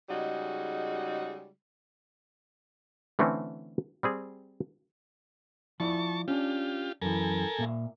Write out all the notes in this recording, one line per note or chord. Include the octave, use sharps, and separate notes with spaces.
C#3 G3 G#3 D#4 F#4
D3 E3 A3 C4 C#4
G3 C4 G#4
F3 E4 D5 A5 C#6
C#4 D4 F4 G4
F#2 E3 A4 A#4 G#5
A#2 A#3 E5